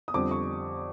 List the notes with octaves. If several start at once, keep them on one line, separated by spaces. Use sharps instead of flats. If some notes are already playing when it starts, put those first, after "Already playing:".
D#6
F2 D3 G3 D6
C#6